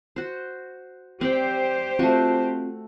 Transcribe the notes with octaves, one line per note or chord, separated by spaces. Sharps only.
F#4 C5
C4 G4 C5 D5 G5
A3 C4 F4 F#4